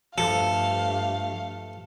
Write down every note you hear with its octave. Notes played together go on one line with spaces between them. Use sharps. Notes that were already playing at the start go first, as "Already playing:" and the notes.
G2 F3 A3 A4 F5